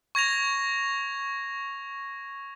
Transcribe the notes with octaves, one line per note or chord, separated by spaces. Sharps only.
C#6 G#6 A#6 F7